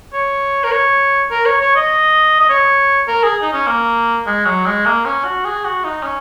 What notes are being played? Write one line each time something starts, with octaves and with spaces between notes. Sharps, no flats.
C#5
A#4
C#5
A#4
C#5
C#5
D#5
D#5
C#5
A#4
G#4
D#4
C#4
A#3
G#3
F#3
G#3
A#3
C#4
F#4
G#4
F#4
D#4
C#4